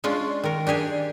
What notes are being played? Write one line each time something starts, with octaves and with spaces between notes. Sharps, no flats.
G#3 C#4 D4 F4
D#3 A#4
D4 G4 G#4 G#5